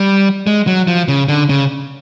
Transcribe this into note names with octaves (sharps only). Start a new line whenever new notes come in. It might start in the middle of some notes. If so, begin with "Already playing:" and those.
Already playing: G3
G#3
F#3
F3
C#3
D3
C#3